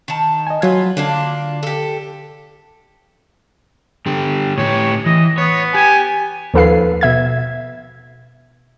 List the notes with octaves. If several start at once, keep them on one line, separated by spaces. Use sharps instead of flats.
D#3 A5
D#5 G#5
F#3 F4 B4 G#6
D3 A#3 D4 F4
G4 A4
D3 G4
A2 G4 C#5
E3 D#5
B3 C#5
G4 G#5
D#2 F3 A4 B4 F5 C7
B2 E5 G#6